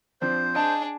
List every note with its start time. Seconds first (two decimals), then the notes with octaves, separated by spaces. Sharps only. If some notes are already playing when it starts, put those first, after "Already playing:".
0.21 F3 C4 D4 C5
0.55 D4 G#4 D#5 A5